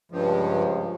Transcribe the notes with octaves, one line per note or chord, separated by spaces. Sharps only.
C#2 G2 F3